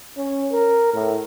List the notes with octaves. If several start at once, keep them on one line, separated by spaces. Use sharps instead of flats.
C#4
A#4
A2